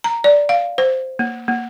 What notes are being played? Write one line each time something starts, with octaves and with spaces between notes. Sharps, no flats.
A#5
D5
F5
C5
A#3
A#3